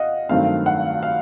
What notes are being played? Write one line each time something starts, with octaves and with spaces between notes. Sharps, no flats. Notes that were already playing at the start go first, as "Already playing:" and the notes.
Already playing: D#5 F5 F#5
G2 D#3 F#3 A3 C4 F5
F#5
F5